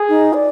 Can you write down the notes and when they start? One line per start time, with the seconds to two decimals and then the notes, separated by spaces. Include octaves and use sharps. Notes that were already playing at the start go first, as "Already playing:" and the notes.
Already playing: G#4
0.09 D#4
0.34 D5